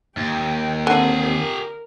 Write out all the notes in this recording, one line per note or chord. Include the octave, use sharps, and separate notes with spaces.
D#2 G5
D3 C4 G4 A#4 G#5
A#4